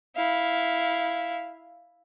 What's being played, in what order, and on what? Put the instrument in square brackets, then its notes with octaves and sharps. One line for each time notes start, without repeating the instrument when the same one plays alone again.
[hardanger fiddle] E4 F5